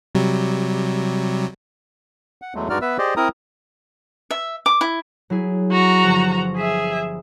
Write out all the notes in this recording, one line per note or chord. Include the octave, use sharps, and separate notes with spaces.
C3 F#3 G3
F#5
E2 F#3 G#3 A3
G2 G#3 D#4 F#4 D5 F6
B3 B4 E5 E6
G4 G#4 C5 D5 D#5
C4 E4 A#4 A#5 D#6
E5
D6
E4
F#3 E4 G#4
F#4 A#5
G1 F3
G#4 E5 B6